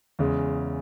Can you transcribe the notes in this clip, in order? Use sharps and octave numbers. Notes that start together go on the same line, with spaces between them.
E2 C#3 G#3